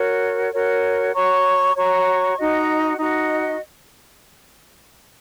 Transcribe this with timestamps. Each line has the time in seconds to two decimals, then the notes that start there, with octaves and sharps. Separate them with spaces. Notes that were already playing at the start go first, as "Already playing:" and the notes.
Already playing: F#4 A#4 C#5
0.52 F#4 A#4 C#5
1.14 F#4 C#5 A#5 C#6
1.75 F#4 C#5 A#5 C#6
2.37 D#4 F#4 D#5
2.98 D#4 F#4 D#5